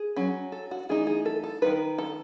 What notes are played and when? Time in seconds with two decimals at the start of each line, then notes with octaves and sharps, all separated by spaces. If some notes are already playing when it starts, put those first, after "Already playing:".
Already playing: G#4
0.16 F#3 C#4
0.52 A4
0.71 F#4
0.89 E3 A3 D#4 G#4
1.07 G#4
1.26 A4
1.44 A4
1.62 D#3 A3 D#4 B4
1.98 A4